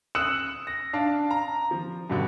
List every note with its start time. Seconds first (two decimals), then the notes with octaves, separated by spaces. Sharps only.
0.15 D#6 E6 F#6 C#7 E7 F#7
0.67 A#6
0.93 D4 F5 A5
1.31 A#5
1.71 F3
2.10 G2 B2 D3